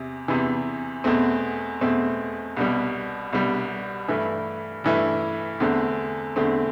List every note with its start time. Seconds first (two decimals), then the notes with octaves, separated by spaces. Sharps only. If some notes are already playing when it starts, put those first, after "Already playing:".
Already playing: E2 C3
0.28 E2 C3 E3
1.04 E2 B2 A3 C4
1.81 E2 B2 A3 C4
2.57 C2 B2 G3
3.33 C2 B2 G3
4.08 G2 E3 A3 E4
4.84 G2 E3 A3 E4
5.60 E2 D3 A3 C4
6.36 E2 D3 A3 C4